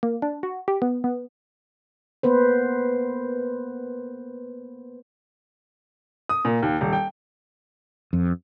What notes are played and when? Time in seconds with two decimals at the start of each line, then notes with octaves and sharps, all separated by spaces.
0.03 A#3
0.22 D4
0.43 F#4
0.68 G4
0.82 B3
1.04 B3
2.23 A#3 B3 B4 C5
6.29 D#6
6.45 A#2
6.63 D#2
6.81 D#1
6.93 G5
8.13 F2